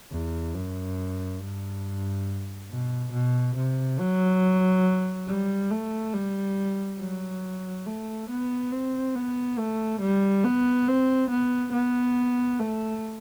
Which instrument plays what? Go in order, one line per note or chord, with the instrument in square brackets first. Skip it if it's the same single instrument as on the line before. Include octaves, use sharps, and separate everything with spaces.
[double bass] E2
F#2
G2
B2
B2
C3
F#3
G3
A3
G3
F#3
A3
B3
C4
B3
A3
G3
B3
C4
B3
B3
A3